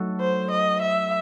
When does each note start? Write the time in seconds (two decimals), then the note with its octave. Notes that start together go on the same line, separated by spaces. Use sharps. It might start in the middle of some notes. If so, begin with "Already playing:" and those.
Already playing: F#3 A3 D#4 F#4 A4
0.20 C5
0.51 D#5
0.82 E5